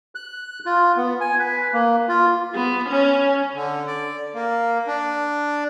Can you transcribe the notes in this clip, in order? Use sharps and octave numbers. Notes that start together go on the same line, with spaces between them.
F#6
F4
B3
G#5
B4
A#3
F4
B3
C#4
D3
D5
A#3
D4